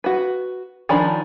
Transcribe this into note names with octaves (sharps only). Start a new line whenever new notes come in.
F#4 B4
D#3 F3 C#4 D4 B5